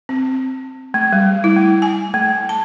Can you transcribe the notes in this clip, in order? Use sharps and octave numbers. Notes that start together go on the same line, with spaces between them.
C4
A3
G3
E4
A3
G#5
A3
A5